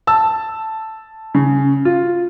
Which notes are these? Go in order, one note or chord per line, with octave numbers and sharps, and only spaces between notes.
A5 E6
C#3
F4